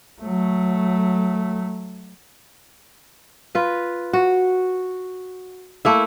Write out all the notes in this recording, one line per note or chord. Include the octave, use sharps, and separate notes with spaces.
F#3 A3
F4 B4
F#4
A3 A#3 E4